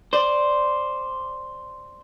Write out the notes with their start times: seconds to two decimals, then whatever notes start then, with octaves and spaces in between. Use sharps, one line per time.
0.13 C5 D5